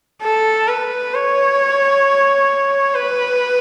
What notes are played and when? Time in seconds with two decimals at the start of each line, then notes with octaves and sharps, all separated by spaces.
0.23 A4
0.68 B4
1.14 C#5
2.95 B4